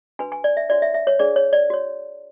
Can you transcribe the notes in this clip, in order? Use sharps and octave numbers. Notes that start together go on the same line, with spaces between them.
D4 F#4 B4 G#5
G#5
D5
E5
D4 F#4 C#5 D5
E5
E5
C#5
D4 G#4 B4 D5
C#5
D5
F#4 C#5